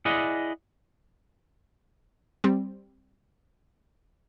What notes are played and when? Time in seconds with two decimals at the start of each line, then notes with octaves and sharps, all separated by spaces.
0.05 E4 G#4 D5 D#5 F#5
2.44 G3 C4